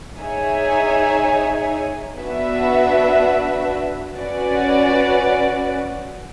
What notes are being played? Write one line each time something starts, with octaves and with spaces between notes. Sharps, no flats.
D#4 G#4 C#5 E5 G#5
B3 D4 F#4 B4 E5
C#4 F#4 B4 D5